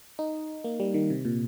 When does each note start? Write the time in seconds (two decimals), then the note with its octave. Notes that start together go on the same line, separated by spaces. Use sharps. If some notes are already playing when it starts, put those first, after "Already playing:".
0.19 D#4
0.64 A#3
0.80 G3
0.94 D#3
1.10 C3
1.25 A#2